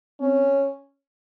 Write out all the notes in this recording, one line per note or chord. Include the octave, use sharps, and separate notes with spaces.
C4 C#4